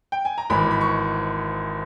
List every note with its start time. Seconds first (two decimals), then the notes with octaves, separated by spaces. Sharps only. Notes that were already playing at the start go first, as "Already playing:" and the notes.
0.12 G5
0.25 G#5
0.38 A#5
0.50 G#1 G#2 E3 B5
0.71 B5
0.81 C#6